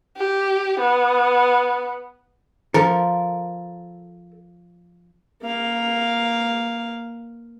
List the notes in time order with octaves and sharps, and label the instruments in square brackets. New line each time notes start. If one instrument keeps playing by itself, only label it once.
[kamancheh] G4
B3
[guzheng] F3 [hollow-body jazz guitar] A4 A#4
[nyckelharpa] A#3 F5